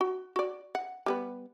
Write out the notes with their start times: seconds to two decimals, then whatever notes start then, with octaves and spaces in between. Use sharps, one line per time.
0.01 F#4
0.36 F#4 D5
0.75 F#5
1.06 G3 B3 B4